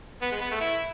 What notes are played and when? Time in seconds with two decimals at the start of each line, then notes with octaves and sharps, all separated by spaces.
0.22 B3
0.31 G#3
0.41 B3
0.51 A3
0.61 E4